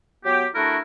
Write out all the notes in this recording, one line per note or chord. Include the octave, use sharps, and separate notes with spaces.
F#3 B3 G4
A3 D4 E4 F#4 A#4